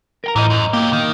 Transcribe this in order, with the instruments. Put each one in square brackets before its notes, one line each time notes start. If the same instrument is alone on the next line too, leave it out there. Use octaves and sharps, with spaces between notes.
[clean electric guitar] A#4 G5 A#5
[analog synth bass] A2 [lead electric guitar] E3 F3 [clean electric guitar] D#5 A#5
[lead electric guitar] F#2
[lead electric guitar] F#3 G4 [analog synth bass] A#3
[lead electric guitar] D#3